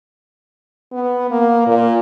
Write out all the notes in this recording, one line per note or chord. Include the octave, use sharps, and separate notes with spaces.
B3
A#3
A#2